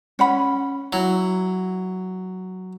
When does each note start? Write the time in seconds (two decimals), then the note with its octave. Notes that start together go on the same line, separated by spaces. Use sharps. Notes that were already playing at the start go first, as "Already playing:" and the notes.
0.19 C#4 F#5 B5
0.93 F#3 E4